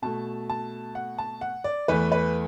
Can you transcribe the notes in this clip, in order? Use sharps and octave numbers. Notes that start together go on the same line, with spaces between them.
B2 A3 A5
A5
F#5
A5
F#5
D5
E2 E3 A3 B4
B4